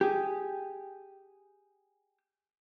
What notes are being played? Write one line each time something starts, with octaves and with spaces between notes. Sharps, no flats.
G4 G#4